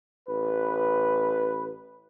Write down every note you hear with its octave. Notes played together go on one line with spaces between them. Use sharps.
A1 B4